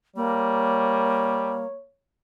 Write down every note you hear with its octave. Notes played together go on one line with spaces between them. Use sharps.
G3 A#3 C#5